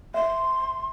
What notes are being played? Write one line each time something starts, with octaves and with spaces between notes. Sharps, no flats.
E5 C6